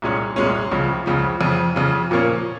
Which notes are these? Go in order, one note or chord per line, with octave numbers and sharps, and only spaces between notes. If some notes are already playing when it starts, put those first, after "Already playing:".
C2 A#2 G#3 C#4
C2 A#2 G#3 C#4
C#2 C#3 F3
C#2 C#3 F3
F2 C#3 F3
F2 C#3 F3
A#2 F3 A#3 C#4